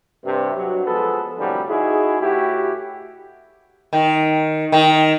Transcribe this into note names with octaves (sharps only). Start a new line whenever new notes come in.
G2 C3
G2 F#3
F3 G#3 B3 A4 B4
C2 F#2 A2 D3 F3 G3
D#4 E4 F#4 G#4
A2 E4 F#4 G4
D#3
D#3